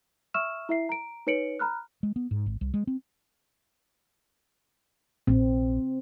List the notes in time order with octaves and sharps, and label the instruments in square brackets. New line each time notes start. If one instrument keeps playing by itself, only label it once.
[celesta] E5 C#6 E6 F6 E7
E4 E5 C7
A#5 D7
D#4 B4 C#5 C#7 D7 F#7
A#5 B5 F6 F#6
[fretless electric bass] G#3
B3
G#2
G#1
C2
G#3
C4
[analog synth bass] A#1 [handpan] C4